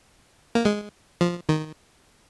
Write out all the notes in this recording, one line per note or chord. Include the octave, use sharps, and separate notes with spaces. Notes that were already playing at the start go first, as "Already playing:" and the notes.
A#3
G#3
F3
D#3